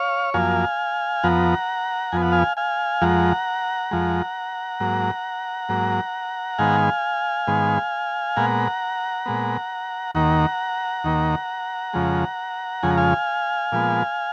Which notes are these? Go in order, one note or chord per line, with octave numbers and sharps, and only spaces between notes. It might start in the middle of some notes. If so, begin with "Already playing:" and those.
Already playing: C#5 F5
F#2 F3 A#3 F5 G#5
F2 F3 B3 F#5 A#5
F2 F3 B3 G#5
F#5
F5 G#5
F5 G#5
F2 F3 G#3 F#5 A#5
F2 F3 G#3
G#2 F#3 A#3
G#2 F#3 A#3
G#2 D#3 G#3 B3 F5 G#5
G#2 D#3 G#3 B3
A#2 G#3 B3 F#5 A#5
A#2 G#3 B3
D#2 D#3 A#3 F#5 A#5
D#2 D#3 A#3
F2 C#3 F3 G#3
F2 C#3 F3 G#3 G#5
A#5
F5 G#5
A#2 F3 G#3 B3